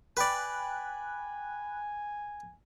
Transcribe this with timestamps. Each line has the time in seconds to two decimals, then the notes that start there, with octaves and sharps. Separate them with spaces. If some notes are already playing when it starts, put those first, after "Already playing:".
0.17 B4 D5 G5 G#5 B5 F#6